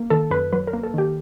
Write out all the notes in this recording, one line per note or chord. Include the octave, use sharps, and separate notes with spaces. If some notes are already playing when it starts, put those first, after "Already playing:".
Already playing: A#3
D#3 A4
F#2 B4
F#3 B4
A#4
A#3
A4
D#3 G4